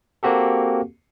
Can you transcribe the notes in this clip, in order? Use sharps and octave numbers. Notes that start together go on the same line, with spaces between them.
A#3 C4 F#4 G4 A4